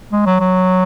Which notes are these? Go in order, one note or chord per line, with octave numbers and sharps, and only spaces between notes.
G#3
F#3
F#3